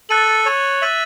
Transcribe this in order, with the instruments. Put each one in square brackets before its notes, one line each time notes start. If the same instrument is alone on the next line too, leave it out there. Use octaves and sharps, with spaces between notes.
[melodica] A4 [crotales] F#6 A6 D#7 F#7
[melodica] C#5
[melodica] E5 [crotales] F#6 A6 D#7 F#7